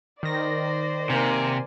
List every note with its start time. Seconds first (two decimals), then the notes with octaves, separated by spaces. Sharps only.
0.23 D#3 C5 D5 A#6
1.10 C3 A#3 G#5